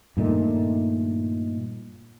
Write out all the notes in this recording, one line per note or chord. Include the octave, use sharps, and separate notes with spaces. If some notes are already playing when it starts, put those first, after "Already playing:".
G2 A#2 D#3 A3